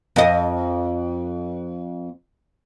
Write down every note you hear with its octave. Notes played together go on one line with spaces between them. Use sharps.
F2 D#5